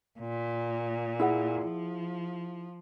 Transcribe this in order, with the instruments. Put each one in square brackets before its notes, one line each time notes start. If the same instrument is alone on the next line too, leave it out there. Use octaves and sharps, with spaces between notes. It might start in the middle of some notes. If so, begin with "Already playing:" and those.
[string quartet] A#2
[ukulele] E4 G#4 F#5
[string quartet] F3